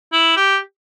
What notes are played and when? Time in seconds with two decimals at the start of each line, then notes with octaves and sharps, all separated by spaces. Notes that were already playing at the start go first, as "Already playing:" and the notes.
0.12 E4
0.36 G4